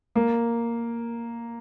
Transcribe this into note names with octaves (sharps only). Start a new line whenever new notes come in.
A#3